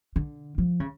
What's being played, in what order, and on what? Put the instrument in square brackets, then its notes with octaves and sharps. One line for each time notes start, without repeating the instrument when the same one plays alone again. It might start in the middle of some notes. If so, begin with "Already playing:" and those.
[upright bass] D3
F3
C#3